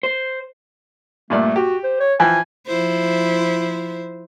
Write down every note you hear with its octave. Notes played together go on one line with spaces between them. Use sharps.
C5
G2 A#2 A3 D5
F#4 G4
C5
C#5
E3 F3 G5 G#5
F3 E4 C5